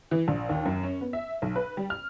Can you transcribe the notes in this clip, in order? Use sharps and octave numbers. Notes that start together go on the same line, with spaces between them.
E3
A#1
D#2
F#2
C#4
B3
E5
B1
B4
G3
F6